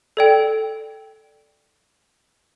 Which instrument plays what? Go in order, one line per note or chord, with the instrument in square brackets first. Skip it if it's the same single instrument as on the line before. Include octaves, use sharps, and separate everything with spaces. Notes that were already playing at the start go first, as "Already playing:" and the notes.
[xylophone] A4 D5 G5